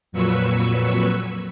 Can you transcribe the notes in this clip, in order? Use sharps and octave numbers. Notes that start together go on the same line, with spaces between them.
F2 A#2 F#3 B4 C#6 E6